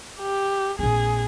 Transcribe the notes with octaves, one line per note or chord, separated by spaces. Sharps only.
G4
A#1 C4 G#4